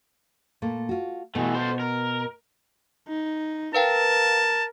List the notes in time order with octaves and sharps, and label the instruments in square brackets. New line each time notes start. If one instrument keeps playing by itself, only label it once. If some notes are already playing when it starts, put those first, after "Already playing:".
[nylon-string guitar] A#2 A3 A#3
F4 F#4
[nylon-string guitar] B2 B3 [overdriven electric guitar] E3 A3
[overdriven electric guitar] A4 C5
A#4
[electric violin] D#4
[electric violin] A#4 [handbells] B4 F5 G5 [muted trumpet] A5